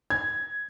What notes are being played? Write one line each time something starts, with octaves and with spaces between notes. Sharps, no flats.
G#6